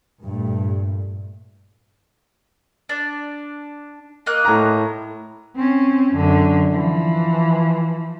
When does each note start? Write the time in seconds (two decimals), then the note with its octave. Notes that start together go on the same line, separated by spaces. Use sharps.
0.23 G2 A#2 A3
2.89 D4
4.26 A#3 D#5 F#6
4.45 A2 A#5
5.55 C4 C#4
6.15 F#2 D3
6.71 E3 F3